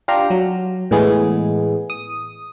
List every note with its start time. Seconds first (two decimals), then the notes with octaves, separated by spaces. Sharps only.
0.08 D4 F4 G4 F5 G5 A#5
0.30 F#3
0.91 A2 E3 G#3 B3 G#4
1.90 D#6